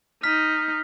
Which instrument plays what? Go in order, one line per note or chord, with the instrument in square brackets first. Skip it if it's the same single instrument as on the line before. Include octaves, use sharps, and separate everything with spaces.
[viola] D#4 [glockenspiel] F6 B6